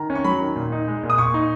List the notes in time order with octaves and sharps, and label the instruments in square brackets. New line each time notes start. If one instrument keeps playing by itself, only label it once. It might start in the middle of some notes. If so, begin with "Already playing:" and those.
Already playing: [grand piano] D#3 A#5
C#4
C#6
F#3 B5
D#3
A#2
D#4
G#3
A#2
D#6
A#2 C#6
D#4